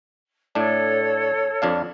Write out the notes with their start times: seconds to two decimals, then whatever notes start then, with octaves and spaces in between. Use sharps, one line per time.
0.55 A2 D4 A4 C#5
1.62 F2 D4 F5